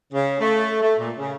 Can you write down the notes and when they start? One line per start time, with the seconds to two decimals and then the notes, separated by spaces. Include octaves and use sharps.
0.13 C#3
0.39 A3
0.82 A3
0.98 A#2
1.17 C#3